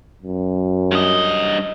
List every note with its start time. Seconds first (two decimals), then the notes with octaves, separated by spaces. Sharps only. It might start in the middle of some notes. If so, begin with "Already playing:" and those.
0.23 F#2
0.91 G2 D#5